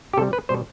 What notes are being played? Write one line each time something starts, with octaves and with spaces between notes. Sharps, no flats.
G4
C3 G3 A4
B4
B2 G3 C5